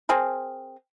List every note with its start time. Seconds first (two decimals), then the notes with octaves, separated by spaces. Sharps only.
0.09 C4 G#4 A#4